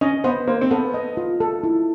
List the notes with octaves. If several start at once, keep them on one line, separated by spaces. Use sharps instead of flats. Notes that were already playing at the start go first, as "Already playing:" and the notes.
C#4 D#5
B3 C5
A#3 C5
C4
B3 A4
D#5
F4
A4
E4